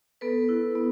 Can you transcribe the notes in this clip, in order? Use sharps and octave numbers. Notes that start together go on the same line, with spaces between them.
B3 A4 B4
E4
B3